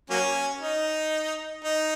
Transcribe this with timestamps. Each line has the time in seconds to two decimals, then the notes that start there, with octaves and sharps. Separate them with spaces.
0.10 F#3 A#3 C#4
0.61 D#4
1.64 D#4